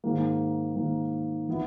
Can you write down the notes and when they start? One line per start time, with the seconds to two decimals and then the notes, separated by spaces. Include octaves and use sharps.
0.04 G#2 D#3 A#3
0.75 G#2 D#3 A#3
1.48 E3 B3 E4